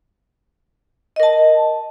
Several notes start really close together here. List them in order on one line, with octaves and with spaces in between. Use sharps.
D#5 A#4 A5